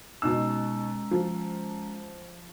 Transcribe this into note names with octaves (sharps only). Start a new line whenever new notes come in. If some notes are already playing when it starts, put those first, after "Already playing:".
B2 G#3 C#4 D#4 A#5 E6
F3